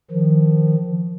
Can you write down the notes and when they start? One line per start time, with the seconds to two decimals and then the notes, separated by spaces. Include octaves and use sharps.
0.11 D#3 F3